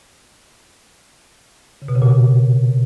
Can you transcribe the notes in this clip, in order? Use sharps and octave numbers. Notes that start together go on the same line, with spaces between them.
C#3
B2
C#3
A#2
B2